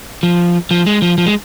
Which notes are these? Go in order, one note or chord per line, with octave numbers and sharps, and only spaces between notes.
F3
F3
G#3
F3
F3
G#3